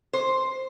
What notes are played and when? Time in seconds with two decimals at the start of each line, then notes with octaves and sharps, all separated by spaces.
0.13 C5